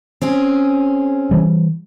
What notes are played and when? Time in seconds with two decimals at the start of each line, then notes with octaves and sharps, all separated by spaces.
0.21 C4 C#4 G#4
1.31 E3 G3